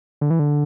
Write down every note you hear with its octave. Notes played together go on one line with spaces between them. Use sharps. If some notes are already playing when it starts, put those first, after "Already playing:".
D3
E3
D3